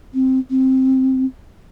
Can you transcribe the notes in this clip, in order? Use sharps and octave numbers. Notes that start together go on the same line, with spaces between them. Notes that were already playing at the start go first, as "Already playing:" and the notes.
C4
C4